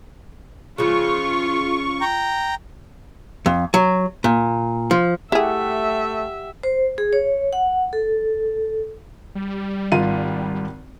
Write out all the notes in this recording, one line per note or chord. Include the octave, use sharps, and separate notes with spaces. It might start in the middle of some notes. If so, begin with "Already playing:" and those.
C#3 F3 G#3 F4 C#6
G5 A#5
F2
F#3
A#2
F3
A3 E4 G4 G#4 E5 F#5
C5
G#4
C#5
F#5
A4
G3
G#1 F4 D#7